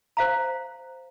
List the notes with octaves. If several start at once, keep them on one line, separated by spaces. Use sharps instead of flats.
C5 F5 A#5